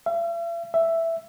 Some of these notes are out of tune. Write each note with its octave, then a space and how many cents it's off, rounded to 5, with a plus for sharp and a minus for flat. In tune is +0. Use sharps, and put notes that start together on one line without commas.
E5 +45
E5 +5